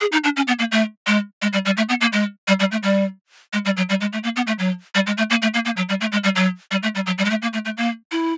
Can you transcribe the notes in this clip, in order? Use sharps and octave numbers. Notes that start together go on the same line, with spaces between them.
G#4
D#4
D4
C#4
B3
A#3
A3
G#3
G#3
G3
G3
A3
B3
A#3
G#3
G3
G3
A3
G3
G#3
G3
F#3
G3
G#3
A3
A#3
B3
A3
F#3
G3
G#3
A3
A#3
A3
A#3
A#3
F#3
G3
A3
G#3
G3
F#3
G3
A3
G3
F#3
G3
G#3
A3
A#3
A3
A3
A#3
E4